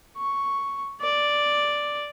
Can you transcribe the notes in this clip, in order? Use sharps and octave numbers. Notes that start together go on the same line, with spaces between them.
C#6
D5